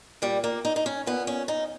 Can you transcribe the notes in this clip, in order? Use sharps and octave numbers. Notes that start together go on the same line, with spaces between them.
A#2 G3
A#3
D#4
D#4
C#4
A#2 B3
C#4
D#4